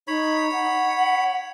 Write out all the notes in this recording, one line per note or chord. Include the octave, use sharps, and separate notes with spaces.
D#4 C#5 B5
F#5